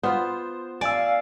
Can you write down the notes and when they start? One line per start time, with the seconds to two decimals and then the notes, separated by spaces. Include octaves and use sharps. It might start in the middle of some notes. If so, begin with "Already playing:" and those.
0.03 B3 F4 C5
0.81 D5 F5 G#5 E6